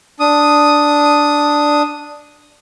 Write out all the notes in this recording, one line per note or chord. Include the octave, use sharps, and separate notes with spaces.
D4 D#6